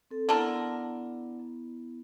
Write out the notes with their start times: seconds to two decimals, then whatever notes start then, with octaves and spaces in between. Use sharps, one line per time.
0.11 C4 A4
0.29 D3 B3 E4 A4 A#4